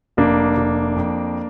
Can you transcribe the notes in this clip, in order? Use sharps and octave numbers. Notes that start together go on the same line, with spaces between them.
F1 A#3 D4
F1
F2